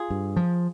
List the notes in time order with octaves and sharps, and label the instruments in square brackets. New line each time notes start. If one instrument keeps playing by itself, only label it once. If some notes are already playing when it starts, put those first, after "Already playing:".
Already playing: [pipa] F4 G#4
[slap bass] G2
F3